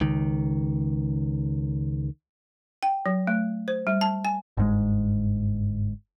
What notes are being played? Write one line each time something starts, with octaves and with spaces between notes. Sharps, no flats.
C#2 D#3
G5
F#3
A3
C5
G3
A5
G#5
G1 G#2 G#3